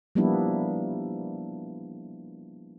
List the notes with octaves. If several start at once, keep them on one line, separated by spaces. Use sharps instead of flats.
F3 G3 A#3 B3 D4 E4